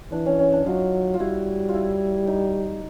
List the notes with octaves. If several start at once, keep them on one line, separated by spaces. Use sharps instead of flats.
E3 D4
C#4
C#4
D4
F#3 D#4 F4
F4
G3 E4 F#4
E4 F4
D#4